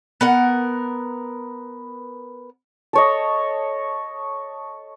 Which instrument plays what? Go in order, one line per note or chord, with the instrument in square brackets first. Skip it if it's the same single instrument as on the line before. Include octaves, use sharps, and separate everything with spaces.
[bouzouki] B3 A#4 F#5
[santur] A4 C#5 D#5